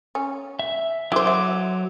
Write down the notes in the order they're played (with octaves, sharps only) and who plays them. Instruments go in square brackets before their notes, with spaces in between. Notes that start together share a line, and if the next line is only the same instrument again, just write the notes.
[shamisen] C#4
[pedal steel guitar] E5
[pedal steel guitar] F#3 D6 [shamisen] E4 C5
[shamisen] E5